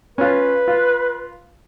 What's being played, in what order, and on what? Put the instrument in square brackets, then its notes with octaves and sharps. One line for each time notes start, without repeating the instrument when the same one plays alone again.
[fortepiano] C#4 F4 [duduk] B4
[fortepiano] F4